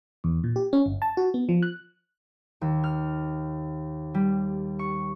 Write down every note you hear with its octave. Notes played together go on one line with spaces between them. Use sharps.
E2
A#2
G4
C#4
G1
A5
F#4
B3
F3
F#6
D#2
F6
G3
C#6